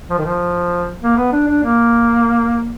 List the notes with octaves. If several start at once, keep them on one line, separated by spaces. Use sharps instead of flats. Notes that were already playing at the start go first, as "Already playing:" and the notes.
F3
D#3
F3
A#3
B3
D4
D4
A#3